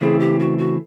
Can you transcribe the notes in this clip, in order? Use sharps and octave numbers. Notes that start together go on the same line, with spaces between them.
C#3 E3 A3 C4 E4 G#4
G4
F#4
F#4